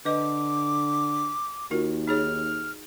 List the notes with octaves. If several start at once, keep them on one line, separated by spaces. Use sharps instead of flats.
D3 B4 D#5 D6
D#2 F4 F#4 A#4
D#4 G#4 C#5 F6